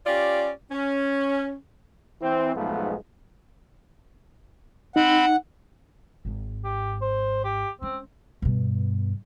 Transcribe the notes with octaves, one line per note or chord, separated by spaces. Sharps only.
C#4 F4 G4 D5
C#4
E3 C4
B1 G#2 F3 G#3 A3 B3
C4 D#4 F#5 B5
G#1 G#2
G4
C5
G4
G#3 C4 C#4
G2 B2